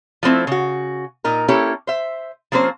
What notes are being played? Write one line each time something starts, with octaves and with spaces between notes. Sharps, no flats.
F3 A3 C4 E4
C#3 F#4
A#2 D#4 A#4
A#3 C#4 E4 G4 A4
C5 E5
F3 A#3 C4 C#4 C5